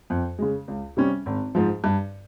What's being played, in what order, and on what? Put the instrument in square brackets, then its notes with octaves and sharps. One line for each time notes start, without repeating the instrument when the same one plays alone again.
[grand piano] F2
C#3 G#3
C#2
C3 G3 C#4
G#1
G#2 F3
G2